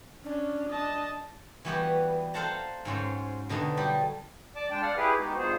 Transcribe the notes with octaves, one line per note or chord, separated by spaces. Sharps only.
C#4 D4
D#5 A5
E3 G3 B3 F#4 G4 B4
A4 C5 F5 F#5 A5 A#5
G#2 F#3 C#4 C5
B2 D3 D#4 A4
F#3 G3 G4
D5 A5 D6
G#3 D4 G5 A5
D5 F5 F#5 F6
E4 G4 G#4 B4
G#3 B3 D#4 F#4 G4
G2 A#2 B3 D#4 G#4 C5